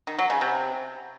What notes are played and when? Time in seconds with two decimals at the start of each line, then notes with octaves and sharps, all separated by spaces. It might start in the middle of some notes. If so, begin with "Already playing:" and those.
0.07 D#3
0.19 F#3
0.30 C#3
0.41 C3